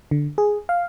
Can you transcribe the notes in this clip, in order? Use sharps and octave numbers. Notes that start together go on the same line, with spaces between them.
D3
G#4
F5